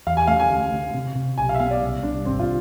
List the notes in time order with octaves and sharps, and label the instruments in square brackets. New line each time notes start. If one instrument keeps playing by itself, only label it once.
[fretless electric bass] E2 [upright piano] F5
[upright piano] G#5
[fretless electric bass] A3 [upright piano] F5
[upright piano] G#5
[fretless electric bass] D2
D2
C3
C3
[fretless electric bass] B1 [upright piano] G#5
[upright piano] F5
E5
[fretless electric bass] B3 [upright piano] F5
[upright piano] D5
[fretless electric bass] C2
[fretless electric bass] C2 [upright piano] D4
[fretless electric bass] G#1 [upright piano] C4
[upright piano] F4